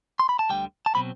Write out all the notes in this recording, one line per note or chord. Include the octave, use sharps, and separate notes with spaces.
C6
B5
A5
D2 D3 G3 G5
A5
B2 F#3 C4 B5